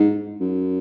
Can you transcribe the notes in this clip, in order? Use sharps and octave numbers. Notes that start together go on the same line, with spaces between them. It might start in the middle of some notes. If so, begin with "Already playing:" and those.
Already playing: G#2
F#2